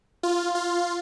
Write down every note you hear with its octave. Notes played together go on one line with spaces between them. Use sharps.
F4
F4